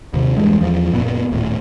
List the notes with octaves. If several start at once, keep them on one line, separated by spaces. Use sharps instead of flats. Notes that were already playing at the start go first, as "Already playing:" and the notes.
D#2 C3
A1 E2 G2 G#3
E2 F3
F#1 A#2 B3
D#1 A2